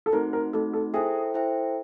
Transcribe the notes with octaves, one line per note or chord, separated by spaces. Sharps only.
A4
A3 C4 D#4 F#4 A#4
A#4
A3 C4 D#4 F#4 A4
A4
E4 G#4 A4 C5 E5 G5
E4 A4 C5 E5 G5